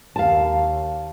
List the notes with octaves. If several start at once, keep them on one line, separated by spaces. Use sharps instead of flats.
D#2 F5 A5